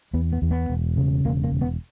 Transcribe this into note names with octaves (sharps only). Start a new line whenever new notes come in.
E2 B3
B3
E2
B3
E1
C#3
E1 A#3
A#3
E1
B3